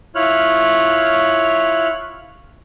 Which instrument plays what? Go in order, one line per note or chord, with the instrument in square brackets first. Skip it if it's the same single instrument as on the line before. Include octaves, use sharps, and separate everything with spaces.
[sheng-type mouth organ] E4 F4 C#5 F6 F#6